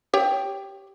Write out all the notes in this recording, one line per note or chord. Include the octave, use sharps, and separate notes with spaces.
G4 C#5 G5